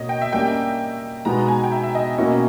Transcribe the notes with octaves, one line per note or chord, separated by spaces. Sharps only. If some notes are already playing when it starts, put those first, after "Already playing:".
Already playing: B2 A#3 C#5 D#5
G5
E5
G3 A#3 C#4 G5
B2 G#3 B3 D#4 A#5
G#5
G5
E5
E5
D#5
B2 A#3 C#4 E4